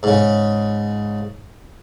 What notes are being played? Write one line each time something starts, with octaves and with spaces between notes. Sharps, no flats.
G#2 C#3